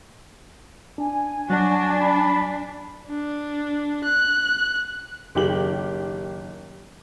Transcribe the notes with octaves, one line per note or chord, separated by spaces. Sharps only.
D4 G#5
F#3 D4 F#4
B5
D4
F#6
F#1 D#3 G4 G5 F#7